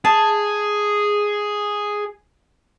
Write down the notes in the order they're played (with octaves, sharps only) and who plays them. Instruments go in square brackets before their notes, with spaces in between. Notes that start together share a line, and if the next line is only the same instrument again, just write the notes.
[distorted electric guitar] G#4 [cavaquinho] A5